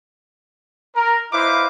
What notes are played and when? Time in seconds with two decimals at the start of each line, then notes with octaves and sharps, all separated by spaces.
0.96 A#4
1.32 D#4 E4 B4 C5 F5 D6